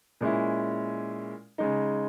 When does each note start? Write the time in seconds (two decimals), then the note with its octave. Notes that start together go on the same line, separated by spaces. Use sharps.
0.21 A#2 G#3 C#4 E4
1.58 C#3 G#3 D#4